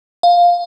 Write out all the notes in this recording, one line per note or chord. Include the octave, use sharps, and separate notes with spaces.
F5